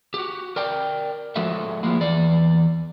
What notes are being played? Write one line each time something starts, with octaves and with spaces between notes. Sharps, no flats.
F#4 G4
A#4 D5 G5
F3 G#3 F#4 A4 E5
F3 G#3 A#3 E4
E2 E3 D5